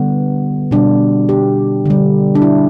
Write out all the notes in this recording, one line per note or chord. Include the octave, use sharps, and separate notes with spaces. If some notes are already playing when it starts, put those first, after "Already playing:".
Already playing: D3 G3 B3
B2 G3 D4
G4
D3 G3
D4
E4